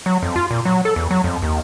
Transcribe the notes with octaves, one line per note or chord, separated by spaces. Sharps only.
F#3
F2
F4
A#2
F#3
A4
E2
F#3
F2
D#2